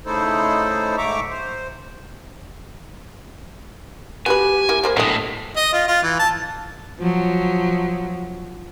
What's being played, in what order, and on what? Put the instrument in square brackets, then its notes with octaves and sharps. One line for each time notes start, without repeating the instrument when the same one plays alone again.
[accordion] C#3 A3 D#4 E4 A4 C5
G#2 A3 E5 A#5 C#6 D6
C5
[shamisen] B3 F#4 B4 [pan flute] G4 [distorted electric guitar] G#5
[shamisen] A#3 E4
G3 A#3 C5
[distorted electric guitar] B1 A2 [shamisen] D3 D#5
[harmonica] D#5
F4
F4
E3
A5
[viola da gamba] F3 F#3